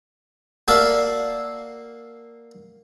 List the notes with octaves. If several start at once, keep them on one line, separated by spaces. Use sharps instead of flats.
A#3 F#4 A4 D5 E5 F5